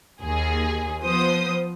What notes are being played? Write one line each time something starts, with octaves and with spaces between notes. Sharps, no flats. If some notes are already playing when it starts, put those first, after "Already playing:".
D#2 G#4
F3 B3 C5 D#6